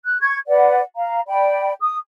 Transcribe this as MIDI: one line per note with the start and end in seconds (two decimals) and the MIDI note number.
0.05 0.20 90
0.21 0.37 85
0.21 0.37 92
0.48 0.80 71
0.48 0.80 74
0.48 0.80 78
0.96 1.20 77
0.96 1.20 82
1.26 1.72 74
1.26 1.72 79
1.26 1.72 83
1.80 1.97 87